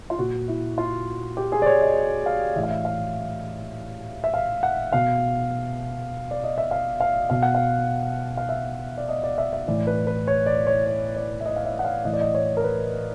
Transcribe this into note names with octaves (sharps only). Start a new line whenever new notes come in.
F4
A#2 F#4
E4
F4
G4
G#4
D5
C#5
D#5
F5
A2 E3 E5 F5
E5
F5
E5
F5
F#5
B2 F5
D5
D#5
E5
F5
F5
B2 F5
F#5
F5
F5
E5
D5
D#5
D5
E5
E5
A2 E3 D5
B4
B4
C#5
D5
C#5
C#5
D5
E5
D#5
F5
E5
F#5
F5
A2 E3 D#5
D5
D#5
C#5
A#4
B4